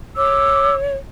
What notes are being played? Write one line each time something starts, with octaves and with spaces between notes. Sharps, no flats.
C#5 D6 E6